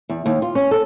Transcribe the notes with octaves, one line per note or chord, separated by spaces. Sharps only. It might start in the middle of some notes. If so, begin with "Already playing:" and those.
E2
D#2
F4
C#4
A4